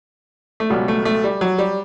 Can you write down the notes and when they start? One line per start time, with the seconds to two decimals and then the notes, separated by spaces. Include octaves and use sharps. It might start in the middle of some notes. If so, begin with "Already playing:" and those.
0.60 A3
0.70 C#2 B2 F#3 G3
0.88 A3
1.05 A3
1.24 G3
1.41 F#3
1.58 G3